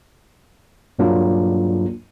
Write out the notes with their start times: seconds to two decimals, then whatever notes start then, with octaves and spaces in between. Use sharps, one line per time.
0.99 G2 F#3 A#3 D4 F4